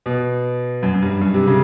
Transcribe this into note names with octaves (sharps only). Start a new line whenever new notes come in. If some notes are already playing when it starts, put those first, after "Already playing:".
B2
F#2
F#2
G2
G2
C3
C#3